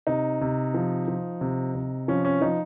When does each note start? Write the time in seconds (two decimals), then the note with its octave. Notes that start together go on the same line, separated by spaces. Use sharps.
0.07 C3 D#4
0.41 C3
0.74 F3
1.08 F3
1.41 C3
1.75 C3
2.08 F3 C#4
2.25 C#4
2.41 F3 D#4